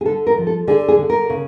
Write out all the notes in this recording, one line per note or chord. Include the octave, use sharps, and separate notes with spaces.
G#4
D3 A4
A#4
F3
A4
D3 G#4
G#4
D3
A#4
C#3